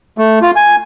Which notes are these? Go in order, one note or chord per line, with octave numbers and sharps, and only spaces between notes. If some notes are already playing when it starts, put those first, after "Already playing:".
A3
F4
G#5